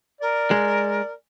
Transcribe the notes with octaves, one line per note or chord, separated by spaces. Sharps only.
A#4 D5
G#3